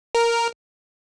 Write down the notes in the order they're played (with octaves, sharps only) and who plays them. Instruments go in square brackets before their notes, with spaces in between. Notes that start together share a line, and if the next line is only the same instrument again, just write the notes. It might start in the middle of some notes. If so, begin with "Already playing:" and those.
[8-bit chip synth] A#4